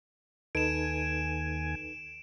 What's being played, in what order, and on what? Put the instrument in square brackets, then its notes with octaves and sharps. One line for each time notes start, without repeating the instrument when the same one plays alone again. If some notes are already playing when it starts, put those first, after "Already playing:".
[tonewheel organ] D#2 G#5 [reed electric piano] D#4 A4 B4 [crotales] D7 E7